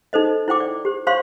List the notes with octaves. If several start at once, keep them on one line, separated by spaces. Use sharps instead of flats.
D#4 A4 C5 D#5
E4 C5 G5 D6
D5
G4 C5
G4 C5 C#5 F5 C6 C#6